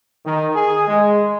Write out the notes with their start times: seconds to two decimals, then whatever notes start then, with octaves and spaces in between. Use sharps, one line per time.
0.25 D#3
0.55 G#4
0.87 G#3